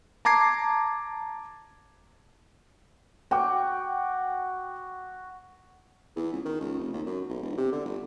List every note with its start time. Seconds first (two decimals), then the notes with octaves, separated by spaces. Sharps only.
0.25 A5 A#5 D6 G#6 C7
3.31 F#4 G5 D6
6.16 E2
6.33 C#2
6.45 D#3
6.61 C#2
6.79 F1
6.93 D#2
7.06 F#2
7.29 B1
7.42 E1
7.57 C3
7.72 D3
7.85 G1